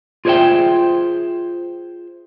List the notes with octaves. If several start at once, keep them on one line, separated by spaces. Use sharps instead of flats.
F4 G#4 C5 D5 E5 G5